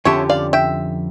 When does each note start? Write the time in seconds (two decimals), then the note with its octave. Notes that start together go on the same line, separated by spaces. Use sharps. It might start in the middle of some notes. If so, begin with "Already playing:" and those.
0.05 F2 D3 F3 C#4 G4 C#5 E5
0.30 D5 F5
0.53 E5 G5